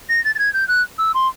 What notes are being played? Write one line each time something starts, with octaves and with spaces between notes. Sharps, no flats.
A#6
A6
A6
G#6
G6
F#6
E6
C6